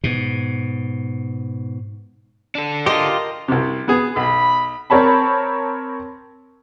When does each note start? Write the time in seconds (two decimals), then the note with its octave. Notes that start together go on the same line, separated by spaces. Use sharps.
0.04 G#2 B2
2.55 D4 A4
2.86 F4 G4 A#4 D#5 C6
3.48 C2 C3
3.88 B3 G#4
4.16 B1 B5
4.90 C4 A#4 C#5 A5 B5